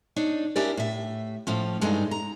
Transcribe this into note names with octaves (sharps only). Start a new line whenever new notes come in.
D4 D#4 C#5
C#4 D4 E4 G4 A#4 D5
A2 E5
A2 F3 C#4
G2 G#3 A3 D4 D#4
A#5